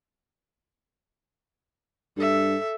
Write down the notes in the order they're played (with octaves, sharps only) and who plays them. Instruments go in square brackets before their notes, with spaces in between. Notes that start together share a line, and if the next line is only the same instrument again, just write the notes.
[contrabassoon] G2 [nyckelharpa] A4 E5